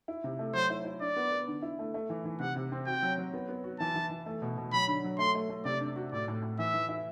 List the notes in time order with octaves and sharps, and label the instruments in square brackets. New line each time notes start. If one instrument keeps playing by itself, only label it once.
[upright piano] E4
C3
A3
[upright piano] F#3 [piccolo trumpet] C5
[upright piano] E4
E4
[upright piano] D4 [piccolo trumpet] D5
[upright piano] B3
B3
D3
E4
A3
A3
E3
E3
[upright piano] C3 [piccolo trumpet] F#5
[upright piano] C3
C4
[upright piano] F#4 [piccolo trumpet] G5
[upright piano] F#3
F#3
B3
B3
F#4
[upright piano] E3 [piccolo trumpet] A5
[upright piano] E3
E3
A3
B2
B2
[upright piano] F#3 [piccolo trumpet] B5
[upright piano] D3
F#3
[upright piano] A3 [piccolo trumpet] C6
[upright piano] A3
A3
[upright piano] C3 [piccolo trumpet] D5
[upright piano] D4
F#4
[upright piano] A2 [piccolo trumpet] D5
[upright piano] A2
A2
[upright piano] E3 [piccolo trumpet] E5
[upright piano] E3
E4